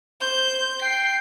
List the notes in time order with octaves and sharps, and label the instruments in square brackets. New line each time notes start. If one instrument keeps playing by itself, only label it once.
[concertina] C5 [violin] G6
[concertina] G5 [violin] C7